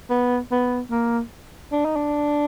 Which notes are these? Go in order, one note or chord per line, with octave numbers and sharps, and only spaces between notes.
B3
B3
A#3
D4
D#4
D4